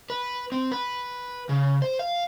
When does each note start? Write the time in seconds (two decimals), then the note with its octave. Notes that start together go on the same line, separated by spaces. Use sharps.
0.10 B4
0.52 C4
0.71 B4
1.49 C#3
1.82 C5
1.99 F5